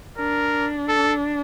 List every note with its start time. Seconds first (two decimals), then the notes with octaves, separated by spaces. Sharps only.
0.18 D4 A#4
0.89 A4